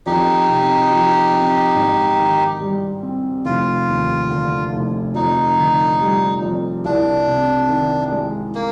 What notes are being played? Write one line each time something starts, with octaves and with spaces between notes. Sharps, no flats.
F2 D#4 G4
C3
F3
C4
G#2
D#3
G3
C4
F1 F4
D#2
D3
F1
F2 D#4
D3
G3
F2
C2 D4
C3
D#3
G#3
A#3